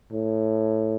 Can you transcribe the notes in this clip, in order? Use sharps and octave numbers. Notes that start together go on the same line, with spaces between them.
A2